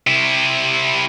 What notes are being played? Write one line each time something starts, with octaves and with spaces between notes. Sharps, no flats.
C3 E4